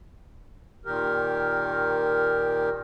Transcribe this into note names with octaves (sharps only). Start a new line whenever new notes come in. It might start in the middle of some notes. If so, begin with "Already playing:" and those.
A#2 D#3 G4 A#4